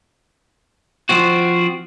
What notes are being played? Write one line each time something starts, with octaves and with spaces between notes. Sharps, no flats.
F3 C4 F#4